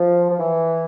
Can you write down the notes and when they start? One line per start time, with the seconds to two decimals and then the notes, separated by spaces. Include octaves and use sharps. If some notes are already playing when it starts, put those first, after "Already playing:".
Already playing: F3
0.30 F3
0.39 E3